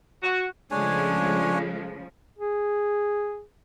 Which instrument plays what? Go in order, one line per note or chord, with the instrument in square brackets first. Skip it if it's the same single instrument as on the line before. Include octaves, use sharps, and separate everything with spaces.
[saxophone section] F#4
[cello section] C#3 F3 [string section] G#3 A3 [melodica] D4 C#5 G#5
[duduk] G#4